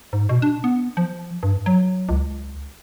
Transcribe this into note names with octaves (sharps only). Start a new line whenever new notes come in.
G#2
B2
D4
B3
F3
G2
F#3
C#2